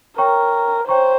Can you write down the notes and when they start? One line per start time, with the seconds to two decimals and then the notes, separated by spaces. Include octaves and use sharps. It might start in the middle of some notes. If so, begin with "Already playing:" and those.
0.18 A#4 C#5 G5 A#5 C#6
0.88 C5 C#5 G5 A#5 C#6